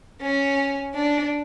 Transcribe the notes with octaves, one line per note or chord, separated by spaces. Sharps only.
C#4
D4